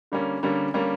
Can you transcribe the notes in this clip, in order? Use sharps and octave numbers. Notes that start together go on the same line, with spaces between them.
D3 G3 A#3 C#4
D3 G3 A#3 C#4
D3 G3 A#3 C#4